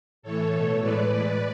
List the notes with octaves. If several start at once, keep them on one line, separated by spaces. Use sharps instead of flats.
A2 E3 A3 A4 C#5
B2 A3
A2 E3 G#3 B4 D5
A2 G#3 B4 D5